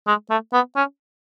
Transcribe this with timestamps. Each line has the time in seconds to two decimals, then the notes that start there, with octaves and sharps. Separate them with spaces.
0.07 G#3
0.30 A3
0.53 B3
0.76 C#4